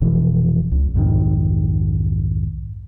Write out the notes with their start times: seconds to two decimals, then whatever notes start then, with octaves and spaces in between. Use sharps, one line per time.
0.01 F1 B2 E3 F3
0.72 C#2
0.94 B1 F2 G#2 D#3